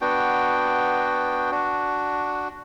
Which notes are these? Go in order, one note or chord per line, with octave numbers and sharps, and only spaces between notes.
B3 D4 F#4 G5
D4 F#4